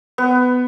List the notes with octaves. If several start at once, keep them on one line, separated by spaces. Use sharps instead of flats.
B3